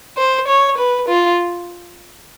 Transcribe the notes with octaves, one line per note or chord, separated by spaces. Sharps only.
C5
C#5
B4
F4